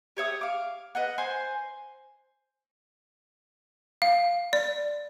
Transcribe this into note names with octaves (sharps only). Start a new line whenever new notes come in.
G4 C#5 E5 D#6
F5 D6
B4 D#5 F#5
C5 G#5 C6
F5
D5